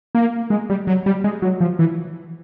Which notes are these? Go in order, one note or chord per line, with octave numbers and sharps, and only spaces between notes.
A#3
G#3
G3
F#3
G3
G#3
F#3
F3
E3